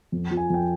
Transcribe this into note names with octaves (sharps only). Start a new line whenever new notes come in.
F2
F3
G#5
F2 G5